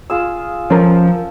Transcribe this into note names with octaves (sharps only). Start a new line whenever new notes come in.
F4 G#4 E6
F3 C#4 A4 A#4